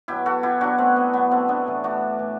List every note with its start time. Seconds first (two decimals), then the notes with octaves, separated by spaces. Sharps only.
0.08 B2 F#3 E4 G4
0.26 F#4 A4
0.43 E4 G4
0.61 B2 F#3 D4 F#4
0.78 A3 C4
0.96 B3
1.14 B2 F#3 B3
1.31 A3 C4
1.49 B3 D4
1.66 A2 E3
1.84 D4 F#4
2.19 A2 E3